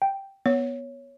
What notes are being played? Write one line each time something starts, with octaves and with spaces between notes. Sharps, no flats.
G5
B3 C#5